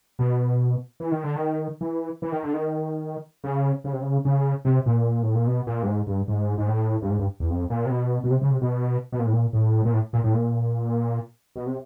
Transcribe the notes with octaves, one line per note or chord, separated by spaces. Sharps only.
B2
E3
D#3
D3
D#3
E3
E3
D#3
D3
D#3
C#3
C#3
C3
C#3
C#3
C3
A#2
A2
A#2
B2
A#2
G2
G#2
G2
G#2
G#2
A2
G2
G#2
G2
E2
F2
A#2
C3
B2
B2
C3
C#3
C3
B2
B2
A#2
A2
A#2
A2
A#2
A2
A#2
A2
A#2
B2
C3